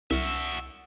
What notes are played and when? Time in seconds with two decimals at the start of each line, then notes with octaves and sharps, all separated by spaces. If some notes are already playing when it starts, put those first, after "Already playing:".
0.11 C2 F#4 E5